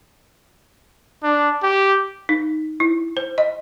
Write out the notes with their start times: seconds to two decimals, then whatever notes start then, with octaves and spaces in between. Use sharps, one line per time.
1.23 D4
1.63 G4
2.29 D#4
2.80 E4
3.17 C5
3.38 D#5